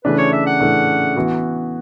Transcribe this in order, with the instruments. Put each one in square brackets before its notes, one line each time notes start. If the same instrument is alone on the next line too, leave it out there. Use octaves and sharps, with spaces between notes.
[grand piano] C#3 E3 A3 D4 [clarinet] B4
[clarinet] C#5
E5
F#5
[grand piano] C#3 E3 A3 D4
E3 B3 F#4